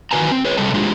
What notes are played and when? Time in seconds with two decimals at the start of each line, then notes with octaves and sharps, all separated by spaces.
0.11 D#3 E3 F#4 B4 G#5 A#5
0.31 C4
0.44 G#4 B4 C#5
0.57 C3 G3 A4 D#5 A5
0.74 G#3 D4 F4 G4 G#4